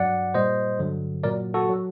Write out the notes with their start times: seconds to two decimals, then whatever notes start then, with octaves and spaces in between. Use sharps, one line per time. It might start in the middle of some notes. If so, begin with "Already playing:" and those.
Already playing: G2 F#3 D5 F#5
0.34 A#2 G3 C5 D#5
0.79 G2 D3 F#3
1.24 A#2 F#3 A#4 D5
1.54 F#4 A4
1.69 F#3